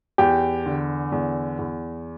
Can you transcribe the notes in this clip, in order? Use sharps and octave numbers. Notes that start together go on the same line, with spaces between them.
E2 G4
D3
E2
E2